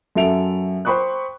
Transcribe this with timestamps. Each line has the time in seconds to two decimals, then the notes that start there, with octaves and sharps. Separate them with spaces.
0.15 F#2 F#4 A4 E5 D7 F7
0.85 C5 G5 B5 C#6 D#6 F#6